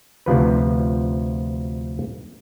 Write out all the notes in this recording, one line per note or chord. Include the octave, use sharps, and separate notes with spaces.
D2 C3 F3 B4